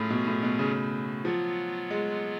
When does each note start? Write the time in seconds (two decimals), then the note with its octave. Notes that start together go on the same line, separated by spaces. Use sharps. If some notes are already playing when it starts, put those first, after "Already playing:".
Already playing: A2 F#3 C#4 F4 G#4
0.10 B2
0.27 A2
0.43 B2
0.59 C#3
1.25 F3 F#3 B3 F4
1.90 G#3